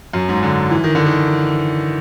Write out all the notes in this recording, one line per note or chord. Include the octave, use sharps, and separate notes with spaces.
F#2
G#2
D3
E3
D#3
D3
D#3